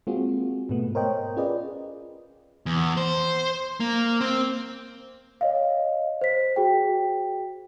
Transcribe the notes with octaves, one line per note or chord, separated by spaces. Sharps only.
G#3 A#3 C4 F4 F#4 G#4
G#2 B2 A3 B3
A#4 C5 C#5 D#5 G5
C#4 F4 G#4 B4 D5 D#5
E2
C5
A#3
C4
C#5 D#5 F5
C5 B6
F#4 G#4 G5